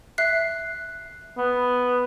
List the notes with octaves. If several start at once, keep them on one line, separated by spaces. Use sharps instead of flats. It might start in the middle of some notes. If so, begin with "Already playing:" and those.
E5 F#6 C7
B3